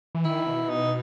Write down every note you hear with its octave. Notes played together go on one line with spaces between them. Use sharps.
E3
D#3 E4
B2
D#4